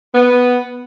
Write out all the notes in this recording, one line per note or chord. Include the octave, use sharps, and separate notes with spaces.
B3